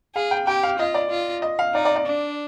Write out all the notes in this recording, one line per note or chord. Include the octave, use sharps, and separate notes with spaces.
G#4 F5
G5
G4 G5
F5
F4 D#5
D5
F4
D#5
F5
D#4 D5
D5
D5
D4